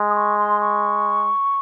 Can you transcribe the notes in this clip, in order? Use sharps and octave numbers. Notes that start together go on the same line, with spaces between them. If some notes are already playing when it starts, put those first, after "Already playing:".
Already playing: G#3
D#6
C#6
C6
C#6